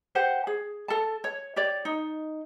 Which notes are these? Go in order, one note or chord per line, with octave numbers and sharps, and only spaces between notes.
G4 C5 F#5
G#4
A4 A5
C#5
G4 C#5 D5
D#4